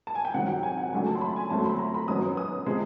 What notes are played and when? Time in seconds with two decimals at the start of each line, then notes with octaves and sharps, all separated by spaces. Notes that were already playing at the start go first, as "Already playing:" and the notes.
0.07 A5
0.15 G#5
0.25 G5
0.34 C3 D#3 F#3 F#5
0.48 G5
0.63 G#5
0.77 F#5
0.93 C#3 F#3 A3 D4 G#5
1.07 A5
1.15 C6
1.21 B5
1.36 G#5
1.50 F2 D3 F#3 A3 C4 A5
1.59 C6
1.65 B5
1.79 A#5
1.94 B5
2.08 F#2 D#3 F#3 B3 D#6
2.37 D#6
2.66 C3 F3 G#3